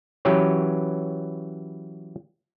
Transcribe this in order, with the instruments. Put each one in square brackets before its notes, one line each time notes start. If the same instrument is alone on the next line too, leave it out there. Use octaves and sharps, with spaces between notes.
[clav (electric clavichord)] E3 F#3 C#4 G4 B4 C#5